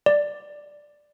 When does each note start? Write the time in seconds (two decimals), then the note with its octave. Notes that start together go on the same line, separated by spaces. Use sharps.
0.06 D5